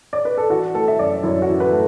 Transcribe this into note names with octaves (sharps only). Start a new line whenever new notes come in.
D5
B4
A4
E3 F#4
A3 A4
E5
F#2 D5
F#2 E4
F#4
E3
B4
A3